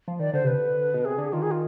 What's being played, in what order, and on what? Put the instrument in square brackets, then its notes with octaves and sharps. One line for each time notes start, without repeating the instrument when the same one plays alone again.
[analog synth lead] F3
[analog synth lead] D#3 [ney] D5
[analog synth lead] D3 [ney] C5
[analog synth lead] C3 [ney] B4
[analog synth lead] D3
B2
[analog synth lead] C3 [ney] G#4
[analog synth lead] D3
[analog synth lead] D#3 [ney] F4
[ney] G#4
F4